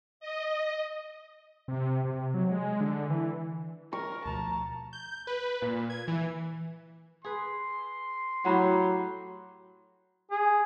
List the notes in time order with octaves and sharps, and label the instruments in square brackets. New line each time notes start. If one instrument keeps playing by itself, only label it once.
[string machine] D#5
[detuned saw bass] C3
C3
F#3
G#3
D3
E3
[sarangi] A#4 [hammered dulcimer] C#6
[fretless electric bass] D2 B2 F3 [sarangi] A5 [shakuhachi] A#5
[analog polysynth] G6
B4
A#2
G#6
E3
[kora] G#4 B4 [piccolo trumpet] C6
[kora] A2 F#4 G4 [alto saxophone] F#3 [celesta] F#5 A#5 B5
[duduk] G#4